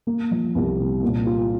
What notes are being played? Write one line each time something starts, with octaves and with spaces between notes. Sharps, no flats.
A#3
F3
C2
C3
A#2
F4